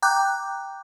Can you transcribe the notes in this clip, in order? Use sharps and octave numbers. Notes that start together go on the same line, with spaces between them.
G5 A#5 D6 F#6 G6